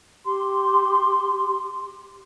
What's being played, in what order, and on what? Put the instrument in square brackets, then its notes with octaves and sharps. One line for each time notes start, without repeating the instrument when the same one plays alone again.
[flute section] G4 C6